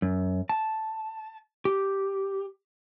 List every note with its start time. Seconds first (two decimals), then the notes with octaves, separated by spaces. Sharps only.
0.02 F#2
0.49 A5
1.65 G4